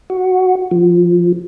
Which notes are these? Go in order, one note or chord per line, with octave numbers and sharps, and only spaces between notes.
F#4
F3